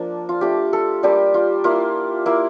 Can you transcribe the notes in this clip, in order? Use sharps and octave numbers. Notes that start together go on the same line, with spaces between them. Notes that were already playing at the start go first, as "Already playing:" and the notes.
Already playing: F3 A#3 D4
F4
A3 D4 F4 G4
A4
G3 A#3 D4 F4 G4
F4
A#3 E4 F4
A#3 E4